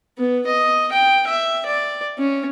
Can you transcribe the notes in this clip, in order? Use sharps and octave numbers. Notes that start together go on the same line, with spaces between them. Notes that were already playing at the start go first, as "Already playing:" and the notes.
B3
D#5
G5
E5
D5
C#4